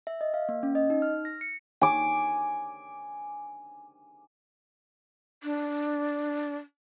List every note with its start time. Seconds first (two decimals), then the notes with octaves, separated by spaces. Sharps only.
0.07 E5
0.21 D#5
0.34 F5
0.49 A#3
0.63 C#4
0.75 D#5
0.90 D#4
1.02 F6
1.25 A#6
1.41 C#7
1.82 G#5 D6
5.43 D4